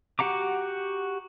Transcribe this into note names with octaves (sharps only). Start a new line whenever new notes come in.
F#4 G4 F#5 A#5 D6